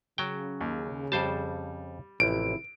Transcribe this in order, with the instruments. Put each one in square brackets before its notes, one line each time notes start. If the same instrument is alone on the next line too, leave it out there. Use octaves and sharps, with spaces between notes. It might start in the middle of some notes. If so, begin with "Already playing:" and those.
[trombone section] C#3 [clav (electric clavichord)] F#3 G5
[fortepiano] D#2
[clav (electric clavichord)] F2 C5 A5 [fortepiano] G3
[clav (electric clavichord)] A1 [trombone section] C3 F3 E4 [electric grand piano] D7